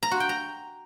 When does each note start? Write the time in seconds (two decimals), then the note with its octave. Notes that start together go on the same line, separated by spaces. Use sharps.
0.03 A#5
0.11 F#4
0.20 G5
0.29 A#5